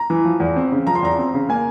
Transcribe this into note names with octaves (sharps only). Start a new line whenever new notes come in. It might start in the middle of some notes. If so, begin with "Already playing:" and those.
Already playing: A#5
E3
F3
E2
C4
C#3
F3 A#5
C6
E2 A#5
C4
C#3
A#3 G#5